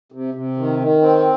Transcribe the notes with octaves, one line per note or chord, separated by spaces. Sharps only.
C3
C3
D#3
D#3
C4